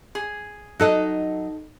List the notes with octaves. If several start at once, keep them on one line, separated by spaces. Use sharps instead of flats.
G#4
F#3 D#4 A4 D#5